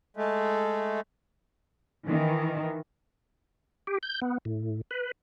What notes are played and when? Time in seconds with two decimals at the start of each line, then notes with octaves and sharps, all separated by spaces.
0.17 G#3 A3
2.07 D#3 E3
3.87 G4
4.03 G6
4.21 B3
4.45 A2
4.91 B4